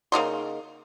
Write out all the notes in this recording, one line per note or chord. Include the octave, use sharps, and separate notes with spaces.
C#3 A#3 D#4 C6